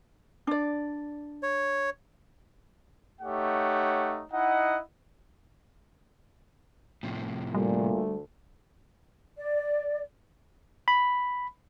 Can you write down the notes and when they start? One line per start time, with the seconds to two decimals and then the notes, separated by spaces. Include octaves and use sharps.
0.47 D4 D5
1.43 C#5
3.22 A3 D#4 G4 C#5 F#5
4.32 D#4 E4 D#5 F#5
7.03 A2 C3 F3
7.55 D2 A#2 G3 A3
9.36 D5
10.88 B5